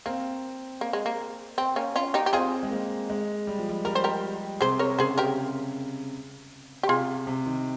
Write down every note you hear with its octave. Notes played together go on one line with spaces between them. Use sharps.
A#3 C4
A#3
G#3
A#3
C4
A#3 C#4
C#4 F4
D#4 G4
G4
C4 F4 G#4
G#3
A#3
G#3
G3
F3
G3
G3 A#4
C5
G4 A#4
C3 G#4 C5
A#4 C#5
C#3 G#4 C5
G4 A#4
G4
C3 F4 G#4
C3
D#3